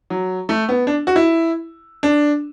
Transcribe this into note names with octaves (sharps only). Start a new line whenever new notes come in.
F#3
A3
B3
D4
F#4
E4
D4